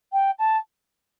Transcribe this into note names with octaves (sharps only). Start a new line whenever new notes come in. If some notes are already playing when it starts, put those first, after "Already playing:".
G5
A5